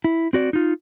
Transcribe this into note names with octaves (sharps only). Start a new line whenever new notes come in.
E4
C4 F#4 D5
D#4 F4